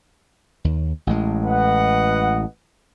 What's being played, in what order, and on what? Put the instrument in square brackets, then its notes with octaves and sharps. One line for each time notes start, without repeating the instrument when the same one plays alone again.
[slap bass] D#2
A1 A2 G#3
[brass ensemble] B4 D#5 F#5